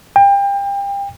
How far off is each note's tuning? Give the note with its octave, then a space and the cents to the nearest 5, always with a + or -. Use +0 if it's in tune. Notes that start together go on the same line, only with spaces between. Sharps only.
G5 +30